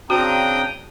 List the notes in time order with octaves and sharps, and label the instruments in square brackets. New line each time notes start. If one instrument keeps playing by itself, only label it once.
[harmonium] C#3 A#5 [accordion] C4 D4 [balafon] F#4 [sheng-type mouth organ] G5 D#6